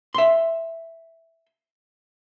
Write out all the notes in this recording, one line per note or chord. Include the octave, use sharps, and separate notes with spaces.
E5 C6